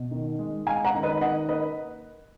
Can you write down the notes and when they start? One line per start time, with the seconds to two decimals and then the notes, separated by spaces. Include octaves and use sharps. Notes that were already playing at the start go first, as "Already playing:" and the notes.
Already playing: B2
0.11 D#3
0.39 G#3
0.67 G#3 F5 G#5
0.85 F#5 A#5
0.94 D#3
1.03 B4 D#5
1.21 D#3 D#5 F#5
1.49 A#3 B4 D#5